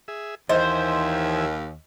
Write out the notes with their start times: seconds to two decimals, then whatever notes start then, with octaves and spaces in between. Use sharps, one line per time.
0.08 G#4 E5
0.49 D#2 E3 C5 D#5 E5 G#5